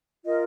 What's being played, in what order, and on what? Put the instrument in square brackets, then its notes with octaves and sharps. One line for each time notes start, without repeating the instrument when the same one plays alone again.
[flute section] F4 A#4 D#5